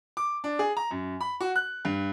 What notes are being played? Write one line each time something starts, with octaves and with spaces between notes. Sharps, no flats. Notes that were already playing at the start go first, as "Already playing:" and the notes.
D6
D4
G#4
A#5
F#2
B5
F#4
F#6
G2